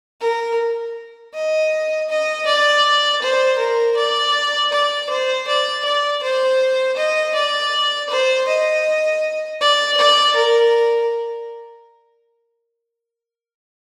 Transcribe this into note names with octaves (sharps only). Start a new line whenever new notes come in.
A#4
D#5
D#5
D5
C5
A#4
D5
D5
C5
D5
D5
C5
D#5
D5
C5
D#5
D5
D5
A#4